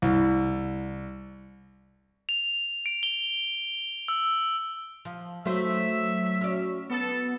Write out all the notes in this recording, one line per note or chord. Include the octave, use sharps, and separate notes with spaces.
C2
F7
D7
G7
E6
F3
F#3 A3 D#4 C5 E5
C#4 D5
B3 A4